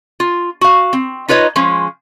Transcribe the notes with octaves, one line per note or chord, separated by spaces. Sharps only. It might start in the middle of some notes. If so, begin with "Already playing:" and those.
F4
F#4 F5
C4
D#4 F4 B4 C#5 D#5
F3 G#3 C#4